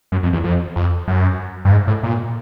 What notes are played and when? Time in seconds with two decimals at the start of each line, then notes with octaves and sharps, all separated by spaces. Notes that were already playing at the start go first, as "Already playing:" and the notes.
0.12 F#2
0.23 F2
0.33 E2
0.44 F2
0.76 F2
1.08 F#2
1.65 G2
1.71 G#2
1.87 A2
2.03 A#2